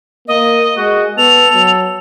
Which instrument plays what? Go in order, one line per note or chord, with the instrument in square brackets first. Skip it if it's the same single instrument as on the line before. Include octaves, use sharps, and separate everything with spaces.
[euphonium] A#3 [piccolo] D#5
[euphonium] G#3 [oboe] F#4
[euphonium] B3 [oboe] A4 [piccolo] F7
[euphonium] F#3